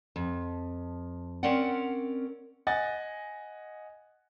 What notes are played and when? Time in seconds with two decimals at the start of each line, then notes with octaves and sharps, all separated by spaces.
0.16 F2
1.43 C4 C#4 A#4 D5 F#5
2.67 D#5 F#5 G#5 A6